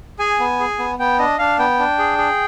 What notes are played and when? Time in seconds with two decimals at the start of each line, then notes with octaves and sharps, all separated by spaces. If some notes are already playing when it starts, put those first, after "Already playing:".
0.19 G#4 G#5
0.40 B3
0.60 G#4
0.79 B3
0.99 B3 G5
1.18 D4 D#5
1.39 D4 F5
1.59 B3 G5
1.79 D4
1.99 G#4
2.18 G#4